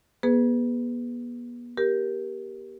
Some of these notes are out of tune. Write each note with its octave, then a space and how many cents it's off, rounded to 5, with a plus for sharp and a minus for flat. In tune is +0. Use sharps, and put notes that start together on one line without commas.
B3 -40 G#4 +5 B4 +20
G4 +0 A#4 +15